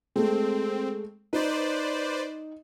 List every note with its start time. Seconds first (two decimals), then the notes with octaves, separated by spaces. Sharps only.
0.16 G#3 A3 C4
1.33 D#4 B4 C5 D5